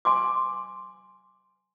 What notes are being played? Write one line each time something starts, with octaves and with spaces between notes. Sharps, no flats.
G#5 C6 D6